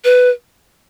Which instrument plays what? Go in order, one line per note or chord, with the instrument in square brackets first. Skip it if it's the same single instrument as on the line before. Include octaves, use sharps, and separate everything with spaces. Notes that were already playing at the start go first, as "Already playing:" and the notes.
[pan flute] B4